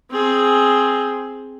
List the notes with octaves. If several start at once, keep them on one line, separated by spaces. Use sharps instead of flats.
C4 G#4